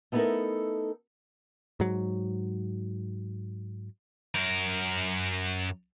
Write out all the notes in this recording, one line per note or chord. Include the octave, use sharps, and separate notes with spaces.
A3 B3 D#4 E4 A4 A#4
G#2 F#3
F#2 A#4